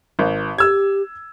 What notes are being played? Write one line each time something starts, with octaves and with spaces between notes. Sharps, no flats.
G#1
G4 E6 G#6